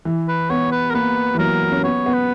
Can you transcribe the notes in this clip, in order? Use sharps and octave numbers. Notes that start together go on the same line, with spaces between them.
E3
B4
B3 C#5
B4
A#4
A#3 B4
E3
F#3 A#4
C#4
B3 C#5
B3
B4